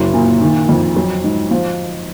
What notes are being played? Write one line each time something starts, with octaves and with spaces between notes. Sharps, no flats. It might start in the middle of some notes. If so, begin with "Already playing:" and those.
Already playing: F#1 F#3
A#2
D#3
F2
F#3
G#2
F3